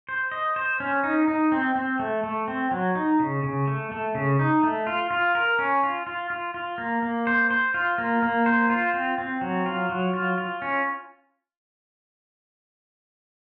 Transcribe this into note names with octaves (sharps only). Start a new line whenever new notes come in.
C5
D#5
C5
C#4
D#4
D#4
C4
C4
A3
A3
C4
F#3
D#4
C#3
C#3
A3
A3
C#3
D#4
A3
F4
F4
A#4
C#4
F4
F4
F4
F4
A#3
A#3
C5
C5
F4
A#3
A#3
C5
F4
C4
C4
F#3
F4
F#3
F4
F4
C#4